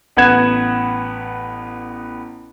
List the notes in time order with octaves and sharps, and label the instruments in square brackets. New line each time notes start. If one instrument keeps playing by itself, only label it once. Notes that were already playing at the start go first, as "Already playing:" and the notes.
[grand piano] A1 B3 B4 F#5 G#6 E7